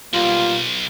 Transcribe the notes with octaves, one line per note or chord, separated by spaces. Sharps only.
B1 G3 A#3 F4